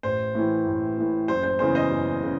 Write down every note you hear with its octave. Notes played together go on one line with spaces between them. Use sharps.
A1 C5
A2 E3
A1
A2 E3
F#1 C5
C5
E2 C#3 E3 C5
C5 D#5
F#1
C#3